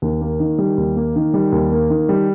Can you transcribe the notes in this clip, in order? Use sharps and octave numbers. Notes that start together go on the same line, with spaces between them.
D#2
A#3
D#3
G3
D#2
A#3
D#3
G3
D#2
A#3
D#3
G3